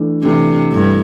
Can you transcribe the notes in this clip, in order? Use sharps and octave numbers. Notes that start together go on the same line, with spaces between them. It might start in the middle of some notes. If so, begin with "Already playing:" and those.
Already playing: E3 A3 D4
C3 E3 A3 D4
G2 E3 A3 E4